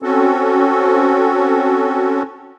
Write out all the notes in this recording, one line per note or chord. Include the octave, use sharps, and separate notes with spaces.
C4 C#4 F#4 A4